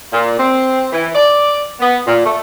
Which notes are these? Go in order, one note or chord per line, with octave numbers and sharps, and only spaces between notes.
A#2
C4
E3
D5
B3
A#2
A3